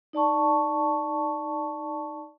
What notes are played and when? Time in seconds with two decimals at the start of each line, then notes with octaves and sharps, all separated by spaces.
0.13 D#4 D5 A5 C#6